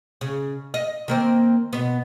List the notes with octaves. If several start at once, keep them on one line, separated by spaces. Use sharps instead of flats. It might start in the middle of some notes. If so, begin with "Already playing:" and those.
C#3
D#5
D#3 A#3 C4
B2 B3